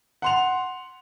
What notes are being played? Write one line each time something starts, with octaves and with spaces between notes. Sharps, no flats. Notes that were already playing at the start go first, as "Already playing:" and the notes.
F#5 C6 F7